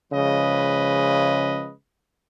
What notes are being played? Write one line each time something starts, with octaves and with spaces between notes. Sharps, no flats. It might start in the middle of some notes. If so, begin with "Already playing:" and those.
C#3 F3 G#3 B4 D#5